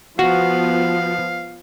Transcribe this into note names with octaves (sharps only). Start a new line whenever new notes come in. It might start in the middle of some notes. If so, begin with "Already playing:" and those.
F3 B3 F#4 F5